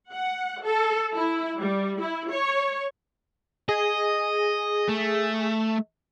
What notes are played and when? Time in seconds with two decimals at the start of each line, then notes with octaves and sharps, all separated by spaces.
0.14 F#5
0.65 A4
1.15 E4
1.58 G3
2.00 E4
2.32 C#5
3.69 G#4 D#5
4.89 A3